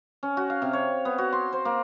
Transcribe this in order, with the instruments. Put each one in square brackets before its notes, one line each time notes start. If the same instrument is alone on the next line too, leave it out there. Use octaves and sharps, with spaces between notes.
[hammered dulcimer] C#4
F#4
F5
C3
C#5
B3
F#4
C6
C5
A#3